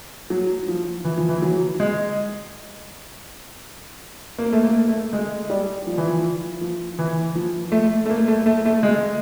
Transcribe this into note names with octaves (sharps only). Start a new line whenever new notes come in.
F#3
F3
E3
F3
E3
F#3
G#3
A#3
A3
A#3
A3
G#3
G3
F3
E3
F3
F3
E3
F3
A3
A3
A#3
A3
A3
A3
G#3